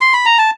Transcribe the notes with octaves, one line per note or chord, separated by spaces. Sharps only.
C6
B5
A#5
A5